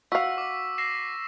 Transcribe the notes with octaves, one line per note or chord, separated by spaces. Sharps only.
F#4 F5 C#6 E6 B6
D6
A#6 C7 E7